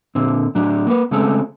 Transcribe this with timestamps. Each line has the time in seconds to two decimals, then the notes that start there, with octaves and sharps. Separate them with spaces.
0.15 A#2 D3 C4
0.55 A2 F#3 D4
0.87 A#3 B4
1.11 C#3 G#3 A3 C4 A4